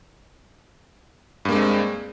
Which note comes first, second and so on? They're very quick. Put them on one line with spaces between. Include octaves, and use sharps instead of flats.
G2 A#3 G#3 C4